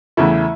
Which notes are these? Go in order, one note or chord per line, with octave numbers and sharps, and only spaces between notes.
E2 C#3 E3 A3 E4